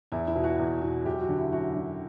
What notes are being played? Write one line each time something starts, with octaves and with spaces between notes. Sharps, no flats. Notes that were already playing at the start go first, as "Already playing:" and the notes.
E2 E4
E4
B2
F#4
E2
B2
F#2 G4
F#4
D3
E4
F#2 F#4
D3